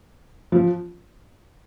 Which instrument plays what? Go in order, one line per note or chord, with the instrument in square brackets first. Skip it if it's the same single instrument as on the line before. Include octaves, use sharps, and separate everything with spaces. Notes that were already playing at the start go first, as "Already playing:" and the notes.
[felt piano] F3